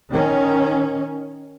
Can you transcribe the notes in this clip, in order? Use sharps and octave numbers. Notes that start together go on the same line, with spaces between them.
D#3 C#4